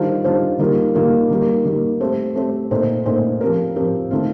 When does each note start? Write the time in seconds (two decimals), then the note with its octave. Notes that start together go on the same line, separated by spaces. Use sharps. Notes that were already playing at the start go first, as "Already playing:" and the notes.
Already playing: D#3 G3 D4 F4 C5
0.24 D#3 G3 D4 F4 C5
0.59 D#3 G3 A#3 F4
0.95 D#3 G3 A#3 F4
1.30 D#3 G3 A#3
1.65 D#3 G3 A#3
2.00 A3 C4 G4 C5
2.36 A3 C4 G4 C5
2.71 A#2 A3 D#4 A4 C5
3.06 A#2 A3 D#4 A4 C5
3.41 F3 C4 G4 A#4
3.76 F3 C4 G4 A#4
4.11 D#3 A3 C4 F4